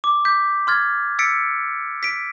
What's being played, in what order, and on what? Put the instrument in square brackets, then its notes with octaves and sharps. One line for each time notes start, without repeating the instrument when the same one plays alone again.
[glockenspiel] D6
D6 G6 B6
C6 F6 G#6 A6
E6 A6 B6 C#7 D7
B6 D7